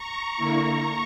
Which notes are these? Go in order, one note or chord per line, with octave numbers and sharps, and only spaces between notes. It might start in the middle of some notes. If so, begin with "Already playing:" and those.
Already playing: A#5 C#6
D3 A#3 E4